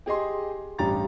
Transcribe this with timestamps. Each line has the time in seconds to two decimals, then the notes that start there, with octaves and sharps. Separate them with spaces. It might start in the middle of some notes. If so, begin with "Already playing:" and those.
0.06 G4 G#4 D#5 C6
0.79 A1 G2 G4 A#5 A6